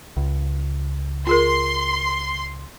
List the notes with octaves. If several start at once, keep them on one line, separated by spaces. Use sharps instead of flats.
C#2
F4 G#4 A#4 C6